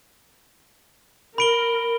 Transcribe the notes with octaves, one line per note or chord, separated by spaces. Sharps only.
A#4 B5 D7 G7